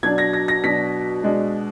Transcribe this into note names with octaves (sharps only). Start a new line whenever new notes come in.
B2 F#3 D4 G#6
A#6
A#6
A#6
B2 F#3 D4 B6
B2 G#3 D4